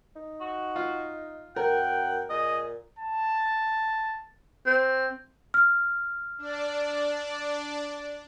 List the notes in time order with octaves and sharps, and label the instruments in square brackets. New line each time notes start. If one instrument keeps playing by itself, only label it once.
[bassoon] D#4
[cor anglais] F#4
[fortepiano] F4
[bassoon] F#2 [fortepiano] A#4 [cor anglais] F#5 [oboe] G5
[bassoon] A#2 [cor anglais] G#4 [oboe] D#5
[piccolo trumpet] A5
[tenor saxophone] C4
[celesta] F6
[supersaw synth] D4 D5